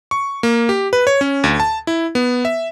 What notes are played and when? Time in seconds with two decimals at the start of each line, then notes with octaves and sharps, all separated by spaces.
0.11 C#6
0.43 A#3
0.69 G4
0.93 B4
1.07 C#5
1.21 C#4
1.44 D2
1.60 A5
1.87 E4
2.15 B3
2.45 E5